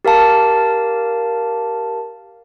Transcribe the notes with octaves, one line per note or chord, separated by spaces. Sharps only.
G4 A#4 F5 A5